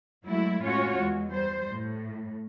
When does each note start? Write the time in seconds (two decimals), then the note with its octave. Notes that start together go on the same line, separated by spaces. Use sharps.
0.25 F#3 G#3 A3 E4
0.64 A2 G#3 C#4 F4 F#4 C#5
0.98 E2 E3 G#3
1.32 G3 C5
1.70 A2